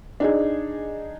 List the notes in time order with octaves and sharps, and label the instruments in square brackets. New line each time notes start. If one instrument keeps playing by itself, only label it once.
[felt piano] D4 D#4 G#4